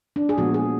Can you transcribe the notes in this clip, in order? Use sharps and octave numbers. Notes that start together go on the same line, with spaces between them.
D4
G#4
A#2 F3 G#3 B3 F#4
G#4